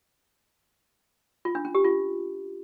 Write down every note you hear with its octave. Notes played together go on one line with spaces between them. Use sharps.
F4
D4
C#4
G4
F4